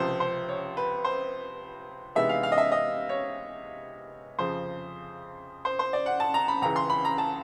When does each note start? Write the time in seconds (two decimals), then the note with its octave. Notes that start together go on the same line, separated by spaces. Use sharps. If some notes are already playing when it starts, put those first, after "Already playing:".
Already playing: C#2 C3 F3 C5
0.20 C5
0.49 C#5
0.77 B4
1.04 C5
2.15 C3 E3 G#3 B3 D#4 E5
2.29 F5
2.43 F5
2.52 D#5
2.58 E5
2.72 D#5
3.09 C#5
4.39 F2 C#3 F3 C5
5.65 C5
5.79 C5
5.93 D5
6.06 F#5
6.20 A5
6.34 A#5
6.48 B5
6.62 C#2 C#3 E3 A#5
6.76 C6
6.90 B5
7.05 A#5
7.18 A5